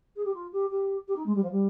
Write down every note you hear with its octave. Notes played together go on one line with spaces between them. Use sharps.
G#4
G4
F4
G4
G4
G4
D#4
G#3
G3
F3
G3